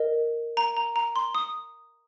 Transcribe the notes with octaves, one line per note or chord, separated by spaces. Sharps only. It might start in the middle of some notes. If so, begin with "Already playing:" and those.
Already playing: A#4 D#5
A#5
A#5
A#5
C6
D#6